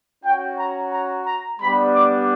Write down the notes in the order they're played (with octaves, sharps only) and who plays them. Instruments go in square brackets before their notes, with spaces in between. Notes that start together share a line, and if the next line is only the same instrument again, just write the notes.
[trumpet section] C#4 F#4 G5
A#5
A#5
A#5
G3 B3 D4 G4 B5
D6